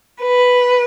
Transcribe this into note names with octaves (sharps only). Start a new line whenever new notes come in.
B4